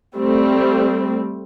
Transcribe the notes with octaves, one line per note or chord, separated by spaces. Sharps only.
G3 A3 C4